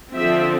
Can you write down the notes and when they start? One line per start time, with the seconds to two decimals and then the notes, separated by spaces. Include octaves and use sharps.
0.15 D3 F3 C4 E5